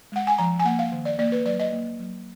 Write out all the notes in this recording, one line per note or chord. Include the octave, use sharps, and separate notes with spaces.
G#3 F#5
G#5
F3 A#5
G#5
A#3 F#5
F5
D#3
D5
A#3 D5
B4
F#3 D5
D#5
A#3
F#3